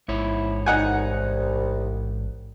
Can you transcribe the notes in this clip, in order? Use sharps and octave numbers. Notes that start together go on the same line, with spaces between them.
A1 G#2 E4 C#5
C2 D#4 F#5 G#5